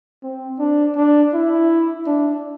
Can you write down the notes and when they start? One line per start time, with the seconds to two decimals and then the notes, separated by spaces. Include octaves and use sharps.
0.23 C4
0.59 D4
0.96 D4
1.34 E4
2.07 D4